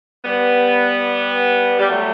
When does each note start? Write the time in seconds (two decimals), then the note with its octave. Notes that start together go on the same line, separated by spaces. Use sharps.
0.25 G3 B3
1.79 G3
1.90 F#3 A3